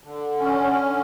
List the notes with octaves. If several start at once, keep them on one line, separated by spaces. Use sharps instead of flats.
D3
C#4
D3